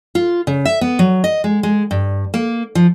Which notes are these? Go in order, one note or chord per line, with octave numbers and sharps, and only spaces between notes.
F4
C#3
E5
B3
F#3
D#5
G#3
G#3
G2
A#3
F3